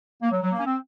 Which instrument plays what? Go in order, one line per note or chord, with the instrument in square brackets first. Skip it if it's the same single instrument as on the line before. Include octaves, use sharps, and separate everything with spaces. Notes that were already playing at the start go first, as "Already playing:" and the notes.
[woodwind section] A#3
F#3
F#3
A#3
C#4
C4